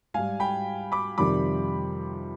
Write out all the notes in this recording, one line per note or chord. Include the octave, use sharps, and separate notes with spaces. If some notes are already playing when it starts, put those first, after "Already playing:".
G#2 G3 F5 G#5
G5 B5
B5 D6
F2 C3 D#3 G3 B5 D6